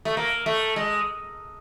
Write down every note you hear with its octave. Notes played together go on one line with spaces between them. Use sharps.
A3
A#3
A3
G#3